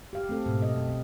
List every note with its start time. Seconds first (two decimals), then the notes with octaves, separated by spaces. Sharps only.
0.13 G4 F5
0.29 A3 C4 A4
0.46 G#2 B2
0.60 B2 D#5
0.76 F#2
0.88 C4